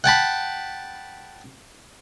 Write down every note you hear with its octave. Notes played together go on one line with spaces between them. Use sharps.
F#5 G5 A5 B5